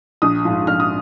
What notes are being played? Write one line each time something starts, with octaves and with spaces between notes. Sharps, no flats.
A#1 D#6
G#2 F3
A#1 F6
D#6